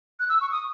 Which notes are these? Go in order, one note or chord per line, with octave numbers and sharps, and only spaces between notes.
F#6
E6
C#6
D#6